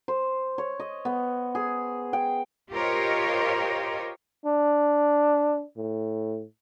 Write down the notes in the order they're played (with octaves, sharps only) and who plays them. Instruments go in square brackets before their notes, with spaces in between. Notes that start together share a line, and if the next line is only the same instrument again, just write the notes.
[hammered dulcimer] C5
C#5
D#5
B3
G#4
G5
[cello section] F4 G4 A#4 C5 C#5 D#5
[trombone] D4
A2